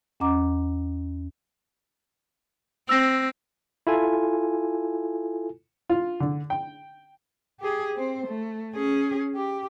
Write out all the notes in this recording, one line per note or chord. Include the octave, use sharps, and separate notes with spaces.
E2 C#4 D#5 F#5 A#5 D6
C4 E6 A#6
E4 F4 A4 G#5
F4
D3
G5
G4 G#4
C4 C5
A3
C#4 G#4
G4